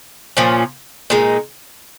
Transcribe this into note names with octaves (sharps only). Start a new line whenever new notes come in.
A#2 F3 C#4
A#2 G#3 D#4